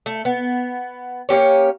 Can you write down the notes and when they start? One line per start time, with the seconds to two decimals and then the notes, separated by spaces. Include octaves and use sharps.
0.06 A3
0.25 B3
1.29 A#3 C#4 G4 C#5